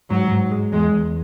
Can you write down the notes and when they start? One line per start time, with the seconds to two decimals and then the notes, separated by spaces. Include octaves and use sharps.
0.10 G#2 F#3
0.31 G#2
0.51 G#3
0.72 E2 G#3
0.92 E2